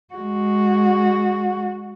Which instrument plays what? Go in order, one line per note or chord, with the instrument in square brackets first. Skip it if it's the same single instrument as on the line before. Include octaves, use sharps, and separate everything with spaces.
[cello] G#3 F#4